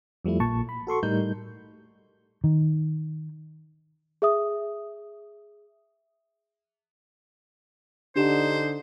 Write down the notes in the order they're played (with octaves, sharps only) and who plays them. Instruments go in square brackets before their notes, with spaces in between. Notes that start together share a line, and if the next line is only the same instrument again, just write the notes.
[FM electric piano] F2 F3 G3 A3 E4
A#1 A#2 A5 C#6
B5
F#4 A4 C6 C#6
A2 G3 D#4 A#4 G6
[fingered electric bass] D#3
[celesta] G#4 E5 D#6
[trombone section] D3 D#4 [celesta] D4 G4 E7 [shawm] C5